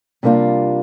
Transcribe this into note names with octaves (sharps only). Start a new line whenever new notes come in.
C3 G3 A#3 D4 F4